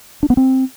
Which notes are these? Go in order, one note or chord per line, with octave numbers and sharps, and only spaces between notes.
D4
B3
C4